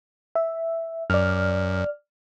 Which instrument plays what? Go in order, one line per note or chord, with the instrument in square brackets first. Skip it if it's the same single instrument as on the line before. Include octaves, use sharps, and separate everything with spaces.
[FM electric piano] E5
[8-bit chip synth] F#2 [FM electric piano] D5 F6